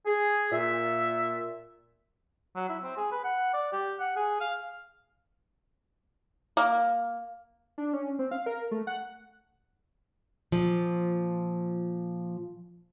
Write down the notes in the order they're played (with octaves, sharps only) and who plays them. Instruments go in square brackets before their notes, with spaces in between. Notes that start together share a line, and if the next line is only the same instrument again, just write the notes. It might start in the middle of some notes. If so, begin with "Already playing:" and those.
[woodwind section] G#4
A#2 E5
[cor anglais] F#3
E4
C4
G#4
B4
F#5
D5
G4
F#5
G#4
F5
[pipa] A#3
[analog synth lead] D4
C#4
C4
F5
A#4
A3
F#5
[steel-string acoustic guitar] A#2 F3